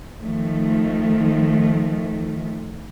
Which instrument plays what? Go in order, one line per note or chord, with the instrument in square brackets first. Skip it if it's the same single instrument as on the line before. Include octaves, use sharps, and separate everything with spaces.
[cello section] D#3 F3 A3